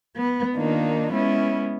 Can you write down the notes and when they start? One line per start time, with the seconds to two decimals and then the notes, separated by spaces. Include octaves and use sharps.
0.16 B3
0.56 D#3 A#3 D4 D#4 F4
1.12 G#3 B3 C#4 E4